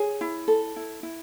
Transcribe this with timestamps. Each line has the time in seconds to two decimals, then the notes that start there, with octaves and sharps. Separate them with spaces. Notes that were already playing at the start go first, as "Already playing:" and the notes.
Already playing: G#4 C#5
0.21 E4
0.48 A4
0.76 E4
1.03 E4